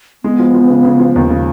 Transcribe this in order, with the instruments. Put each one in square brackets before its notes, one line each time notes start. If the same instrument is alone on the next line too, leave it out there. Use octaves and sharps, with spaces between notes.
[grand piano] G#3 [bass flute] B3
[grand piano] F3
F3
C#3
C#3
F3
D#2
C#3